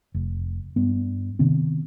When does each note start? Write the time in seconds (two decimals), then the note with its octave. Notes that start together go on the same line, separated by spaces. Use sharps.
0.14 F1
0.76 G2 B3
1.39 C3 D#3 B3 C4